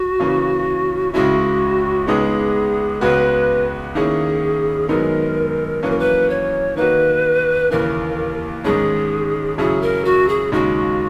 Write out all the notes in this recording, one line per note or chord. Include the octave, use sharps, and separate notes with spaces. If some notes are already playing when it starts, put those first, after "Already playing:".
Already playing: F#4
C#3 E3 A#3 C#4
C#2 C#3 G#3 C#4 E4 F#4
C#2 C#3 G#3 B3 D#4 G#4
C#2 C#3 G#3 B3 F#4 B4
D#3 A#3 C#4 E4 G#4
F#2 D#3 G#3 B3 D#4 A#4
F#2 E3 A#3 C#4 B4
A#4
B4
C#5
D#3 A#3 D#4 F#4 B4
D#2 C#3 E3 A#4
G#2 D#3 G#3 C#4 G#4
F#2 C#3 F#3 C#4 E4 G#4
A#4
F#4
G#4
D#2 C#3 G#3 D#4 F#4